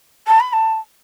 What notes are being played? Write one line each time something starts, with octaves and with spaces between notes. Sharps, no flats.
A5
B5
A5